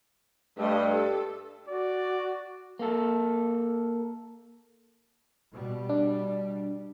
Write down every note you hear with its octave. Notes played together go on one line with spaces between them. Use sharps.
G2 A3 D#5
A4
F#4 D5
A#3 A4
B2 G3
D4